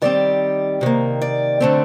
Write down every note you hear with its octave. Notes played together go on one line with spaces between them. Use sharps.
D#3 G3 C4 D5
C3 D#3 A#3
D5
D3 A3 C4